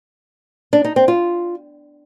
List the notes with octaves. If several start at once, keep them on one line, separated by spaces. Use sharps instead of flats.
D4
D#4
C4
F4